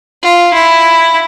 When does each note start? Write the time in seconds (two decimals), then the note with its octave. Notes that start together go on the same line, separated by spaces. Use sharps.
0.23 F4
0.54 E4